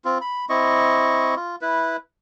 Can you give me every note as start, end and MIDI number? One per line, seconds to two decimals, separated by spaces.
0.05 0.18 60
0.05 0.18 65
0.21 0.45 83
0.49 1.35 60
0.49 1.35 64
0.49 1.35 75
0.49 1.35 85
1.36 1.56 65
1.61 1.97 64
1.61 1.97 71